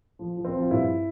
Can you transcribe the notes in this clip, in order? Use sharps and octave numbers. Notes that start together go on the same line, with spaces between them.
F3
F3
C4
F3
F4
G2 E4